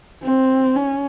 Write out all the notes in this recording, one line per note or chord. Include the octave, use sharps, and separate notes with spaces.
C4
C#4